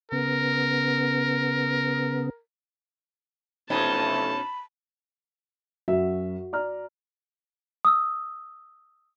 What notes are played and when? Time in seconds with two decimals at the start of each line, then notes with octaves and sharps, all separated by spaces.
0.12 C#3 B3 A#4
3.70 F2 B2 E3 A3 C#4 D#4 A5 B5
5.88 F#2 F#4 E5
6.53 D5 A#5 F6
7.85 D#6 E6